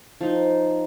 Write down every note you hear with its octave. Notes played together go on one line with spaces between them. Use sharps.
F3 D#4